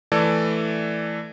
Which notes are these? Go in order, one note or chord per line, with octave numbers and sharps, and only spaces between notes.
E3 A3 A4 D5